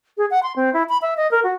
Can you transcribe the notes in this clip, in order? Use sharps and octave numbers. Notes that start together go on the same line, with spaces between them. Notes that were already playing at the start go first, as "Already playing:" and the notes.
G#4
F#5
C6
C4
E4
B5
E5
D#5
A#4
F#4